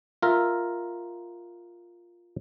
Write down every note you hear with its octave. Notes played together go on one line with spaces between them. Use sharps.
F4 A#4 E5